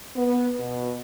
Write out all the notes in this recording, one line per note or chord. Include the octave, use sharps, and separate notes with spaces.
B3
B2